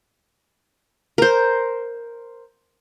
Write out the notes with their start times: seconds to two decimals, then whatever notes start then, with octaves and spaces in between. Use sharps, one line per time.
1.18 A#4 C5